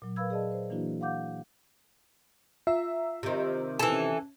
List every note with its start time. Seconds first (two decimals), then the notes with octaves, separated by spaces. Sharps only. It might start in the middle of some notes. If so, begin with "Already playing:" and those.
0.02 A#2 F#3
0.16 A#4 B4 F5 B5 E6 G#6
0.30 G#4 D5 D#5 A5
0.52 C5
0.70 E3 A#3 D4 E4 F#4
1.01 F5 F#5 D6 G6
2.67 F4 E5 A#5 E6
3.23 C3 D#3
3.79 E3 A4
3.92 C#4